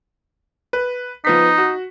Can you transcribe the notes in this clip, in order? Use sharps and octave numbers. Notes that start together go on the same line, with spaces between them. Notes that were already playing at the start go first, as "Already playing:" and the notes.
B4
F3 B3 D#4 B6
F#4